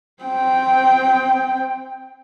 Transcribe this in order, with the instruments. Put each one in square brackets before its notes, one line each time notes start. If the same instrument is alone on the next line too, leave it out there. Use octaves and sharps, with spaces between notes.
[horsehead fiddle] C4 G5